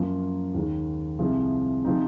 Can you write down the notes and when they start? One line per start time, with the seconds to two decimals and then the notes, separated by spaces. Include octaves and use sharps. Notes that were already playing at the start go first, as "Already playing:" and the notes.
Already playing: F#2 F3 A#3 F4
0.54 D#2 D#3 G#3
1.19 C2 C3 F3 G#3
1.84 C3 F3 C4 D#4